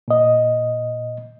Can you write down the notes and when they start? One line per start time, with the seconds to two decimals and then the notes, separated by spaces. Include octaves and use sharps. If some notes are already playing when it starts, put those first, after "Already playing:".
0.08 A#2 D#5